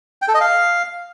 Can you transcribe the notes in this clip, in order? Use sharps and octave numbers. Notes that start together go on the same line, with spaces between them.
G5
A4
D#5
F5